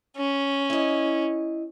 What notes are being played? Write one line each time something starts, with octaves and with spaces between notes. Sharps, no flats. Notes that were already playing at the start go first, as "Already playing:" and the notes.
C#4
E4 D#5